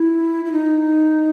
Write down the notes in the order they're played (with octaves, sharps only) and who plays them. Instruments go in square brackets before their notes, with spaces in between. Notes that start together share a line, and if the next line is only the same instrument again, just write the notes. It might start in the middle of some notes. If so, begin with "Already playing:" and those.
Already playing: [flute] E4
E4
D#4